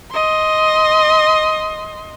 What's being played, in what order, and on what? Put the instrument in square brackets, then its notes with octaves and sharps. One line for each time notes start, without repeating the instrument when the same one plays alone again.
[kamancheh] D#5 C6